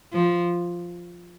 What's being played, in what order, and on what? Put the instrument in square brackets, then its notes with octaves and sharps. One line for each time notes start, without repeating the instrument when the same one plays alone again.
[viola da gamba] F3